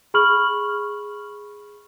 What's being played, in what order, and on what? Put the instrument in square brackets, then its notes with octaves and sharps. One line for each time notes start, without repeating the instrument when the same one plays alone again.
[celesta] G#4 B5 C#6 F6 F#7